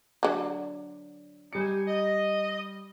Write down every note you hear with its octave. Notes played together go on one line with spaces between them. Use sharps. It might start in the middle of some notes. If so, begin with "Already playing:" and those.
D3 F#3
G3 D#4 C5 G#5 C#7
D#5